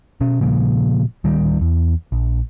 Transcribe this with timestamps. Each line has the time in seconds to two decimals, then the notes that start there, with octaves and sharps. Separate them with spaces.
0.21 B2 C#4
0.41 A#2 C#3 F3 A#3
1.24 D1 D#3 G3
1.61 E2
2.12 A#1